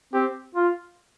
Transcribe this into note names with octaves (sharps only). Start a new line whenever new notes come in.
C4 G4
F4